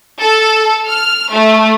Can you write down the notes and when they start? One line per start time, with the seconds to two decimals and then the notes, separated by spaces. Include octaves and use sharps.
0.21 A4
0.87 F6
1.31 A3